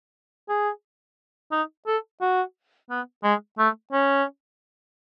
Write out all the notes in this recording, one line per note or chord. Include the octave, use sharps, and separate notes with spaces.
G#4
D#4
A4
F#4
B3
G#3
A3
C#4